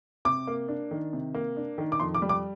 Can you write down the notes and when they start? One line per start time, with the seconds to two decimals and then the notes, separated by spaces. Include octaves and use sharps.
0.25 C3 D6
0.47 A#3
0.68 D4
0.91 D#3
1.13 C3
1.34 A#3
1.57 D4
1.78 D#3
1.92 D6
2.00 F2 C6
2.15 D6
2.22 G3
2.29 D6